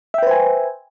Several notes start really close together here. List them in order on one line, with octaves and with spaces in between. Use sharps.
E5 G5 B4 C5 G#5